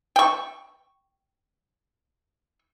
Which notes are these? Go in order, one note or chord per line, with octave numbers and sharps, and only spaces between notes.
G5 C#6